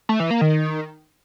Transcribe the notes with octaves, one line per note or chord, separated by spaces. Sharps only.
A3
E3
A#3
D#3